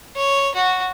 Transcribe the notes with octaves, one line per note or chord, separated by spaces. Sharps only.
C#5
F#4